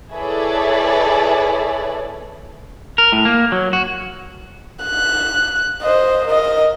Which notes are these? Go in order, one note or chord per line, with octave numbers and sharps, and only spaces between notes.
E4 G#4 A4 B4 C#5 D5
A#4
A2
A#3
F#3
F#4
F#6
C5 D#5
A#4 D#5